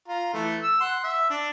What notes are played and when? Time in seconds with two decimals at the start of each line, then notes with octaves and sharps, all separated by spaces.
0.08 F4 A#5
0.33 E3 A3
0.62 E6
0.81 F#5 C6
1.04 E5
1.30 D4